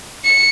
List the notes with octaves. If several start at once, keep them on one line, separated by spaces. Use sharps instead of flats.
C#7